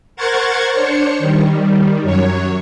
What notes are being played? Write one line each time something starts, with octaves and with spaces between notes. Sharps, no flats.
A#4 C5 F#5 C#6 G#6 A6
D4 C5 C#5 C#6
D#3 G3
F#2 F#3 C#5